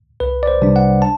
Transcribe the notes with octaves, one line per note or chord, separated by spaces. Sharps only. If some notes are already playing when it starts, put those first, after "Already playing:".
C2 B4
D5
C5
C3 G3 D4
F#5
A5